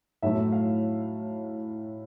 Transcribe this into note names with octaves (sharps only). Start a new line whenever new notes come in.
A2 F#3 A3 E5
F5